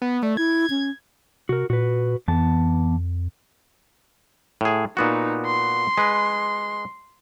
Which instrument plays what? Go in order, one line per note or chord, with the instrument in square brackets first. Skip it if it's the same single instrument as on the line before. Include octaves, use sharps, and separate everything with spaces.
[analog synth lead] B3
[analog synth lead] A3 [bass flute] D5
[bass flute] E4 [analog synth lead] G#6
[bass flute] C#4
[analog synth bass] C3 [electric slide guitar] F#4 A#4
[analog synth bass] A#2 [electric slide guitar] F#4 B4
[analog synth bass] F2 [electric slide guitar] E3 B3 A5
[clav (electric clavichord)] A2 G#4
[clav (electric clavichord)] A#2 B3 F#4 [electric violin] D#4
[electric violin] C6
[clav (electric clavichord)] G#3 B4